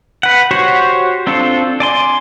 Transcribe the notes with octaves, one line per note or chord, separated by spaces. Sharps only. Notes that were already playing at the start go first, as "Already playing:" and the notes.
B4 F#5
F#4 G4 C5 C#5
C4 D4 F4 A4
D5 G#5 C6